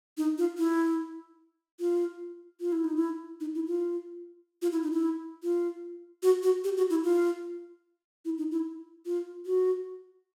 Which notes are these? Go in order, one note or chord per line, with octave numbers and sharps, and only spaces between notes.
D#4
F4
E4
F4
F4
E4
D#4
E4
D#4
E4
F4
F4
E4
D#4
E4
F4
F#4
F#4
G4
F#4
E4
F4
E4
D#4
E4
F4
F#4